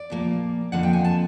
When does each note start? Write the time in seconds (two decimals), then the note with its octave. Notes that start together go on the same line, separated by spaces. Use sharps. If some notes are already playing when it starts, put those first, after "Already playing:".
Already playing: D5
0.10 A#2 F3 A#3
0.72 F2 D3 F3 A#3 F#5
0.83 G5
0.93 G#5
1.04 A5